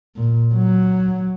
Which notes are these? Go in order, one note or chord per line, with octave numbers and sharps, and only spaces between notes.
A#2
F#3